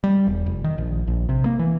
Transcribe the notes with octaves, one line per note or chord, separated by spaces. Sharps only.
G3
E1
F1
D#3
A#1
A#1
C3
A#3
E3